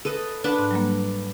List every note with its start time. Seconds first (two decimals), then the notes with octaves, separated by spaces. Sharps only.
0.05 A4 B4 D#5
0.44 D4 B4 F#5
0.59 G#2
0.71 F#3 G3 A#3